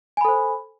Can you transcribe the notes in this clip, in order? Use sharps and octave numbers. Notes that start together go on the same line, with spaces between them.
A4 C5 G#5 B5